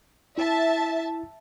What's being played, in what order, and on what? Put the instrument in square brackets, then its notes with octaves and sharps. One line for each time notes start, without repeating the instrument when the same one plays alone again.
[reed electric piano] E4 [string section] E5 A5